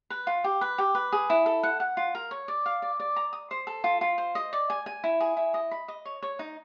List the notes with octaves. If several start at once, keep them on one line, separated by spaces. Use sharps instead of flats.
B4
F4
G4
B4
G4
B4
G#4
E4
A4
F#5
F#5
F4
A#4
C#5
D5
F5
D5
D5
A#5
D#6
C5
A4
F4
F4
C5
D#5
D5
G#5
G#5
E4
G#4
E4
D#5
B5
D#5
C#5
C#5
D#4